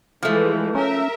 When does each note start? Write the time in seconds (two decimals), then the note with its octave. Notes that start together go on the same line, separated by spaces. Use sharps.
0.23 E3 F3 G#3 A3
0.75 C#4 A#4 E5